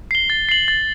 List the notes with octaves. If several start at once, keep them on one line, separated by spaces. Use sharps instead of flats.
C7 G7
A6
C7 F#7
A6